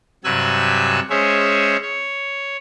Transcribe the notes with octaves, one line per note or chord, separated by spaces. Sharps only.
G2 C3 F#3 G#5 E6 F#6
G#3 C#4 G#4 C5 C#5 E5
C#5